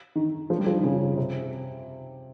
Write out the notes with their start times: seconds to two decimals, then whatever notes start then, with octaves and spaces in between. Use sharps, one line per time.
0.16 D#3
0.50 F3
0.58 G3
0.66 F3
0.75 D#3
0.84 C#3
1.17 C3